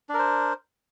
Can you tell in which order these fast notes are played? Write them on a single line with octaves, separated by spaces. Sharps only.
D4 A#4 C5